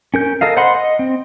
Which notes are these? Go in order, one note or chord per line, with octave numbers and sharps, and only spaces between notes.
C#4 A#4 G6
A4 A#4 D#5 F5
C5 D#5 F#5 B5 C6
D#5
C4